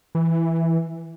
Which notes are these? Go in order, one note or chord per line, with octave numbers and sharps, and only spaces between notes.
E3